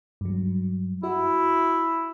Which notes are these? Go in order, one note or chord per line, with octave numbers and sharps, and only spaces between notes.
G2 F#3
E4 F#4 E5